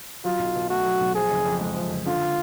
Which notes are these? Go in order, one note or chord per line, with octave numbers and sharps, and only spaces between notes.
F#3 F4
B1
B2
A3 F#4
F#3
B1
F3 G#4
F#1
F2
G#3
F3
F#1
D3 F4